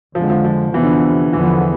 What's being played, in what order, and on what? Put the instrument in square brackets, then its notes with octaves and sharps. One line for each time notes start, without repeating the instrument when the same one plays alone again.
[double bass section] F2 D3 G#3 [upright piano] F3
[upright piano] F3
F3
[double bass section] E2 C3 F3 B3 [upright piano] E3
[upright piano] D3
[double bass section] E2 D3 F3 B3 [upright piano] E3